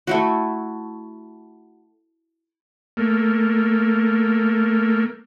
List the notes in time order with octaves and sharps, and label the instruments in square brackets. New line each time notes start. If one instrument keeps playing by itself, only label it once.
[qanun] A3 E4 F#4
[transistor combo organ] A3 A#3